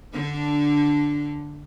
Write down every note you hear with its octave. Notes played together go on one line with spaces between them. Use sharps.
D3 D4